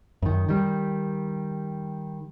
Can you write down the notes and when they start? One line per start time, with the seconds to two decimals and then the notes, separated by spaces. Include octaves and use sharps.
0.22 F#2 D#3
0.49 D#3 G3